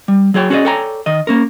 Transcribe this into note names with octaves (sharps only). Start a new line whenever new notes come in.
G3
F#3 G#4 C#5 G5
C#4 F#4 G#4 C5 D5 D#5
A4 C#5 D5 G5 G#5 A#5
D#3 D#5
A#3 C#4 A#4